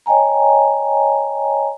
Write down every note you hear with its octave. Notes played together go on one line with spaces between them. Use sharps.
C#5 D#5 G5 G#5 A#5